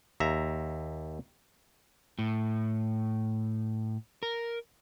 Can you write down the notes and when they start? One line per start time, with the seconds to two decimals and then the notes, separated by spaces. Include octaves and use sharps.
0.20 D#2 E5 A#5
2.19 A2
4.23 A#4